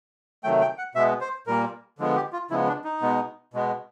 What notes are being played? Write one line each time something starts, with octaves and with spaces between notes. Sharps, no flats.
C3 D#3 F#3 A3 G5
G5
F#5
B2 G#3 B3 E5
C5
A#2 G3 A#3 A#4
D3 F3 G#3 B3
G4
F4
C#3 F3 G#3 B3 E4
D4
D#4
B2 G#3 B3
B2 G#3 B3